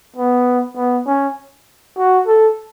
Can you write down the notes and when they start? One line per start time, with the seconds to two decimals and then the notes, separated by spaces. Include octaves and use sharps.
0.16 B3
0.76 B3
1.06 C#4
1.98 F#4
2.27 A4